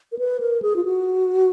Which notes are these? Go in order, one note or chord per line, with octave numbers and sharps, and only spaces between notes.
A#4
B4
A#4
G#4
F4
F#4